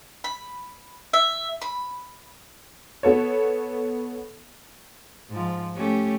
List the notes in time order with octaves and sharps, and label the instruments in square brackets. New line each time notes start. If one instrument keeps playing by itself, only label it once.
[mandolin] B5
E5
B5
[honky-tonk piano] B3 A4 C#5
[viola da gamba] G#2 F3
A3 C#4 G4